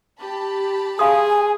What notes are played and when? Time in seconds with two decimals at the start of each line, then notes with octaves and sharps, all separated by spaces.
0.20 G4 A5 B5
0.99 G#4 F5 G#5 C6 D#6